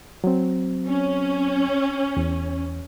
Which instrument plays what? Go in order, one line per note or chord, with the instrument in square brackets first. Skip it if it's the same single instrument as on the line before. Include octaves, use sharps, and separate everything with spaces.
[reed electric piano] F#3 C4
[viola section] C#4
[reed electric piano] E2